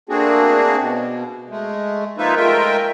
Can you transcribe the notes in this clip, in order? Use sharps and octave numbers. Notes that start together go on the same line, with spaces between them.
A3 A#3 C4 D4 F#4 G#4
B2
G#3 A3
F3 A#3 D#4 F4 B4 E5
G#3 A3 F4 A#4 E5 G5